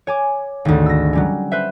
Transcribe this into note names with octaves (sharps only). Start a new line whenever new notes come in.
C#5 G#5 D6
G#1 D2
E6 A#6
F#3 G3 C#4
B4 C5 E5